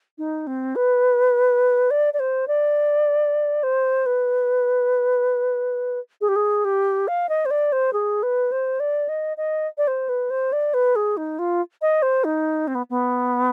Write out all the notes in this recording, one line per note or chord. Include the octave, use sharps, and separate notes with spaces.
D#4
C4
B4
D5
D5
C5
D5
C5
B4
G#4
G4
G#4
G4
F5
D#5
C5
D5
C5
G#4
B4
C5
D5
D#5
D#5
D5
C5
B4
C5
D5
B4
G#4
D#4
F4
D#5
C5
D#4
C4
B3
B3